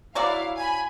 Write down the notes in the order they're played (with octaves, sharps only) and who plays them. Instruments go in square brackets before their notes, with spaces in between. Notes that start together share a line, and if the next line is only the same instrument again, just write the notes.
[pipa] F#3 F#4 D5 [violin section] E4 F5
[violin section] G#5 B5